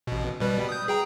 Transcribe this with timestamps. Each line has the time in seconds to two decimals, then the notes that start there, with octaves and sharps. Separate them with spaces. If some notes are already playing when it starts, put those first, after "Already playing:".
0.07 A1 B2
0.41 B2 G3 B4
0.69 D#6 G6
0.88 G#4 G5 A#5